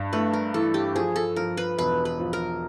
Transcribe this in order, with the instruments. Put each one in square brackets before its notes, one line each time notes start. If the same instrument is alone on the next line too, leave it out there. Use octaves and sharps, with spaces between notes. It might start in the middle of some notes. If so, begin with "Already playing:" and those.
Already playing: [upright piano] G2
[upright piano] A3 [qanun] B4
[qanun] A#4
[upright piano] E3 [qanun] A4
[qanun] G4
[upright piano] F3 [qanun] G#4
[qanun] A4
[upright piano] F3 [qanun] A#4
[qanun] B4
[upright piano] E1 [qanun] B4
[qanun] B4
[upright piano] F3
[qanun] A#4